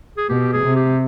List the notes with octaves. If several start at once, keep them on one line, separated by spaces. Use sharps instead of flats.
G#4
B2 G4
G#4
C3
G4